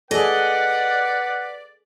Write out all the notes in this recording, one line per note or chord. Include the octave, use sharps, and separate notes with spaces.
G#4 A4 B4 D5 D#5 F#5